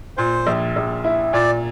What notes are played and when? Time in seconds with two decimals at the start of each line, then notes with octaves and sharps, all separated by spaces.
0.17 A#2 C5
0.47 A#1
0.76 A#1
1.04 E4
1.33 A#2 D5